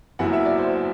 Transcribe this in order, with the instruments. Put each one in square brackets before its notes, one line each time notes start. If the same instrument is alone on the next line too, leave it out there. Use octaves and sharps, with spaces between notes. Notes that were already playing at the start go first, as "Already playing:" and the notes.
[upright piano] F#1 F#2 F#3 B3 E4 F#5
E5
D5
C5